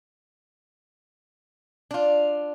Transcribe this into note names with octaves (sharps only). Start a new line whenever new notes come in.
D4 F4